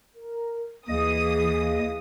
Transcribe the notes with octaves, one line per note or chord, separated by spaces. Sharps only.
A#4
D#2 E3 G#4 D#5 F5 D#6